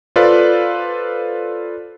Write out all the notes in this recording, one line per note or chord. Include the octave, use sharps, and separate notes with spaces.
F4 A4 B4 C5 D5 F5